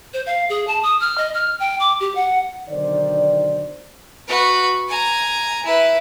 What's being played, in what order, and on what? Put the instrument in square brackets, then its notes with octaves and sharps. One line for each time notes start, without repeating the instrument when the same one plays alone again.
[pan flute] C5
F5
G#4
A5
D#6
F6
D#5
F6
G5
D6
G4
F#5
[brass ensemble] B1 D3 D#3 D#4 C5 D5
[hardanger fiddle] F#4 B4
G#5 A#5
E4 B4